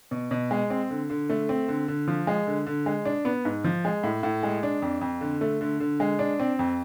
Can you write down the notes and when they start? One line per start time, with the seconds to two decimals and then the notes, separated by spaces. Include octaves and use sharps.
0.11 B2
0.31 B2
0.51 G#3
0.70 C4
0.90 D3
1.10 D3
1.30 A3
1.49 C4
1.68 D3
1.88 D3
2.08 F3
2.27 G#3
2.47 D3
2.66 D3
2.86 G#3
3.05 D4
3.25 B3
3.45 G#2
3.64 F3
3.85 G#3
4.03 A2
4.23 A2
4.43 G#3
4.63 D4
4.82 F2
5.01 F2
5.21 D3
5.41 A3
5.61 D3
5.80 D3
6.00 G#3
6.19 D4
6.40 C4
6.59 F2